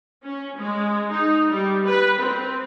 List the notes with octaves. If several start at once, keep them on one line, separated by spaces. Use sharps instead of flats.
C#4
G#3
D#4
G3
B4
C4